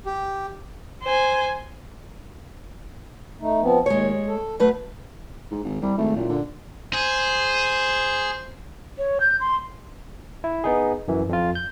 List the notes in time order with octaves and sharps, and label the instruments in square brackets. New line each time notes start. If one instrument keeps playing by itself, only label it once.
[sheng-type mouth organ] G4
[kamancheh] C5 G#5
[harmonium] A3 D#4
F3 B3 C4
[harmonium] D#2 [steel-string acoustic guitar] G#3 C#5
[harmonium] A4
[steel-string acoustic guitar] F#3 A3 B4
[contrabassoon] G#2
G#1
[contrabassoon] C2 [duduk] G3
[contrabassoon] G#1 [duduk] A3
[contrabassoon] F#1 [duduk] A#2
[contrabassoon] D3
[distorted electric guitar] G#4 [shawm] C5
[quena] C#5
G6
C6
[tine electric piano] E4
B3 D#4 G#4
F#2 E3
F2 F4
G6